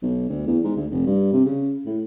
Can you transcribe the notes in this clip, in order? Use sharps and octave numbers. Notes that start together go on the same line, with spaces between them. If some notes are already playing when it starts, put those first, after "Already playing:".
B1
D2
E2
G#2
D2
F1
G2
C3
C#3
A2